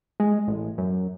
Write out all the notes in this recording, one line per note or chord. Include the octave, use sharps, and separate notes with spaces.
G#3
A1
F#2